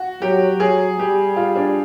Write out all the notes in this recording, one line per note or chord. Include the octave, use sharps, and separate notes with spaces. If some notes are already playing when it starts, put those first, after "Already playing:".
Already playing: F#4
F#3 G4
F#3 G#4
G3 G4
F4
D4